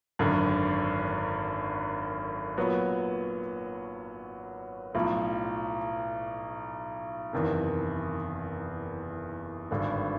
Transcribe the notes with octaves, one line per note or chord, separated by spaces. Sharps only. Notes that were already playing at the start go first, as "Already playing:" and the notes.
G#1 F#2 D3
A#2 F#3 B3
B1 A2 F3
F#1 E2 C3 D#3
G#1 G2 D3